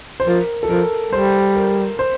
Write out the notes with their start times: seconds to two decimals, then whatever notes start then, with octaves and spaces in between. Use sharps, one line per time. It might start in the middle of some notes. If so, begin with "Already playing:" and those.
0.20 C5
0.27 F3 A#4
0.63 A4
0.70 F3 A#4
1.12 G3 C5
1.55 A#4
1.99 C5